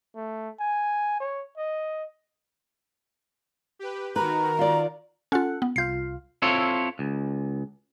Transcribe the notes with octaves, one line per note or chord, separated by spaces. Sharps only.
A3
G#5
C#5
D#5
G4 B4
D#3 F#4 A#4 B4 A#5
F4 D5
C#4 F4 A4 F#5
B3
C2 F4 F5 G6 C7
C4 E4 F4 A4 C#5
C#2